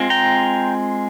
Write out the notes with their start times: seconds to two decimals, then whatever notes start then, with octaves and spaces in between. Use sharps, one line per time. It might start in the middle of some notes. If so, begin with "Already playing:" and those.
Already playing: G#3 C4 F4
0.10 G5 A#5